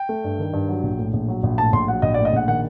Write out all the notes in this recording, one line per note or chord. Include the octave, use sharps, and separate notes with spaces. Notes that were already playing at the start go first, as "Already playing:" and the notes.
Already playing: G5
A3
G2
D#3
G2
F#3
A#1
A2
A#1
F#3
A#1
A2 A5
A#1 C6
F#3 F#5
A#1 D#5
D5
A2
D#5
A#1 F#5
D#3 F#5